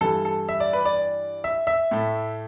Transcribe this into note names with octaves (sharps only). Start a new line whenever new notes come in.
G2 E3 G3 A4
A4
E5
D5
B4
D5
E5
E5
A2 A3